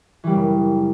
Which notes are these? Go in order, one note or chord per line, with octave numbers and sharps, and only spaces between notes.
F#2 C#3 E3 G3